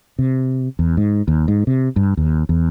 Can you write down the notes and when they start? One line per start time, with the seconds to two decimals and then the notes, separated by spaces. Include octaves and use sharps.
0.19 C3
0.79 E2
0.97 G#2
1.28 D#2
1.48 G#2
1.67 C3
1.96 G2
2.17 D#2
2.49 E2